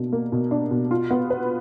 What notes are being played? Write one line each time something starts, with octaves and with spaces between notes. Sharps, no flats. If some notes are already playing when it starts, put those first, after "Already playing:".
Already playing: B2 A#3 D4
A#3
B2
D4
B2
F4
B3
B4